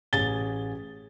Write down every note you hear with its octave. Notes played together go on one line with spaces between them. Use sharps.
A1 G#4 A6 G7